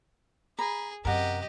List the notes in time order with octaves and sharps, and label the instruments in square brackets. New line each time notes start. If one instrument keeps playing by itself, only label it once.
[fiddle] G#4 [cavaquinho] A#5 B5
[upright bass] F#2 C3 [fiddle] G4 D#5 [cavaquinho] A#4 F#5